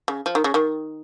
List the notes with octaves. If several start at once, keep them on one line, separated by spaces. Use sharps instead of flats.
C#3
F3
D#3
C#3
D#3